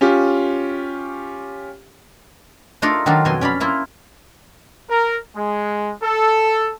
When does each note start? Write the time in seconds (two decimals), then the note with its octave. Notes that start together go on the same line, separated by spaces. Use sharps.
0.01 C#4 F4 G4
2.82 A3 D4 D#4 F4 A4 A#4
3.06 D#3 F#3 D4 F4
3.25 F2 B2 F#3 G#5 C6
3.41 C#4 D5 F5 B5
3.60 A#3 E4 F4
4.90 A#4
5.36 G#3
6.03 A4